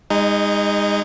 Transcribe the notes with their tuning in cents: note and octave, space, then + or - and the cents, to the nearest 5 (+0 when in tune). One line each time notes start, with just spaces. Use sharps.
G#3 -35 D#4 +0